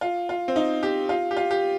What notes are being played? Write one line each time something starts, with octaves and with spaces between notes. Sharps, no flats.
F4
F4
C4
D#4
G4
F4
G4
F4
G4